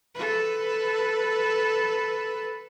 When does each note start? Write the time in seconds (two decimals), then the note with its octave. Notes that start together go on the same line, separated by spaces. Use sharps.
0.15 A4 B4